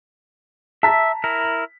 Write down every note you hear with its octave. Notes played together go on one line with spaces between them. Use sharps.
E5 A5 A#5 B6
E4 A#4